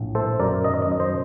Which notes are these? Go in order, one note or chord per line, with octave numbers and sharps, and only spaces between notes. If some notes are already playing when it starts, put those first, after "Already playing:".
Already playing: A#1 A2
A3 A4 C5
F#2 A#4 D5
D#3 D#5
D#5
F#2
C5 D#5